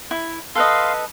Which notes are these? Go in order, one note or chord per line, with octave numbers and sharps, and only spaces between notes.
E4
A4 B4 D#5 F5 C6